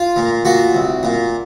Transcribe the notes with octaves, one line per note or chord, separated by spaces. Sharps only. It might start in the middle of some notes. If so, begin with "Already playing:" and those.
Already playing: F4
A#2
A#2 F#4
C2
A#2